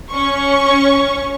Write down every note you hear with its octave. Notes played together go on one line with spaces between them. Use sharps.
C#4 C#6